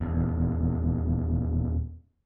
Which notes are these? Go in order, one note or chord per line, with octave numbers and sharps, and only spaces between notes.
D#1 E2